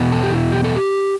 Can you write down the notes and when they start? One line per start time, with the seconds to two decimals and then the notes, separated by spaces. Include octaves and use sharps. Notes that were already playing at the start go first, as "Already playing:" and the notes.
Already playing: E2 B2 B3
0.12 A4
0.23 G4
0.32 E4
0.52 G4
0.64 A4
0.76 G4